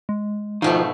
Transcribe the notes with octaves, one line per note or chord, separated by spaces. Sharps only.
G#3
G#2 B2 D#3 F3 A3 F5